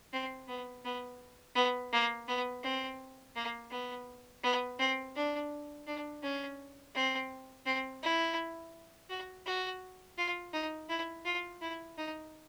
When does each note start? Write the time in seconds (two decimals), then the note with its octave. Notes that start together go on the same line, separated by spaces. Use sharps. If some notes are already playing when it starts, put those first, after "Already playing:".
0.13 C4
0.48 B3
0.85 B3
1.55 B3
1.92 A#3
2.28 B3
2.64 C4
3.36 A#3
3.71 B3
4.44 B3
4.79 C4
5.15 D4
5.87 D4
6.23 C#4
6.95 C4
7.66 C4
8.03 E4
9.10 F#4
9.46 F#4
10.18 F4
10.53 D#4
10.89 E4
11.25 F4
11.61 E4
11.98 D#4